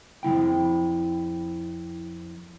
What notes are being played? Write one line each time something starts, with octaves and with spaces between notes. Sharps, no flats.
F2 D#3 E4 G5